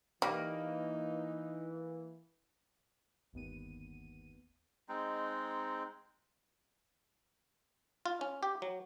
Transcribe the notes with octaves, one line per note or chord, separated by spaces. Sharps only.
E3 G3 A#3 D#4 B4
G1 D#2 B3 D#7
G#3 C4 D#4
F4
C#4
G4
F#3